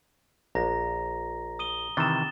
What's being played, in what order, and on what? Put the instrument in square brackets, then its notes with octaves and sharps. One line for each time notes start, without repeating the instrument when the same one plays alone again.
[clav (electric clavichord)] A#1 [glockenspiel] A#5 A#6
[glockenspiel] D#6 D#7 G7
[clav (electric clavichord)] C3 D#3 E3 [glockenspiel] A6 E7